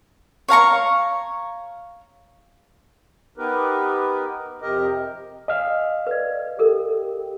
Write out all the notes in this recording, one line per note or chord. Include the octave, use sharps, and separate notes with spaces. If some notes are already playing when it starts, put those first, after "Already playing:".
C#5 F5 A#5 C#6
B3 D#4 G4 A#4 B4
F2 C3 G4 A#4 D#5
D#5 F5 G#5 F6
B4 D5
G4 A4 A#4